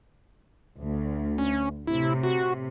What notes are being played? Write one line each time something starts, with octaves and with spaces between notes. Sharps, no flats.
D2
C#4
A2 C3 E4
F#4